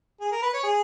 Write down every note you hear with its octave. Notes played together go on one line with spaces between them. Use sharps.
G#4
A#4
B4
C#5
G#4